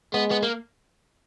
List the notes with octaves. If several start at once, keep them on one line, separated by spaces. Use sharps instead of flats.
G#3 B3
B3
A#3